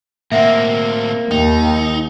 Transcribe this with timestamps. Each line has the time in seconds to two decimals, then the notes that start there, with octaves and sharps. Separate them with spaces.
0.32 A2 A#3 C4 E5 F#5 G5
1.31 D#2 D#4 G5